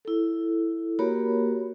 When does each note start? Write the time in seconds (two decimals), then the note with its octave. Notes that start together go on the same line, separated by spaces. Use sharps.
0.05 E4 A4
0.99 A#3 F#4 G4 A#4 C#5 B5